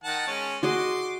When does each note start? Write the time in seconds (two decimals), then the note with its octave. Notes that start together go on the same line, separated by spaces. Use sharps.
0.04 D#3 F#5 A5
0.28 G#3 C#4
0.63 F#4 G#4 D#5 C6 D6